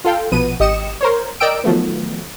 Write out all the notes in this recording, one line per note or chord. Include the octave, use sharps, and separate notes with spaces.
F4 A4 F5 G5
A#1 B2 F3 B3 D#7
G#1 G4 D#5 D#6 C#7 E7
A#4 C5 C#5
A#4 D5 D#5 G5 E6 D7
D#3 F3 F#3 A3 B3